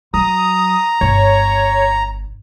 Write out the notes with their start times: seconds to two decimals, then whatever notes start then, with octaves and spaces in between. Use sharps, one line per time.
0.14 F#3 A#5 D#6
1.01 G1 C#5